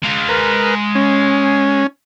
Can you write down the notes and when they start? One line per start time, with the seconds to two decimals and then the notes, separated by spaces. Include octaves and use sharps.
0.03 G#3 F5
0.29 A#4 B4
0.95 C#4